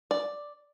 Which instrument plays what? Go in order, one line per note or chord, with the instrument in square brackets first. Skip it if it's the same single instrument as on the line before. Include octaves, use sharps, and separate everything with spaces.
[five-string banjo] D5